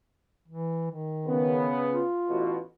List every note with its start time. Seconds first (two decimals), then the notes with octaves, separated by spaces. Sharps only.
0.48 E3
0.91 D#3
1.27 C#3 B3
1.92 F4
2.28 A1 B2 F#4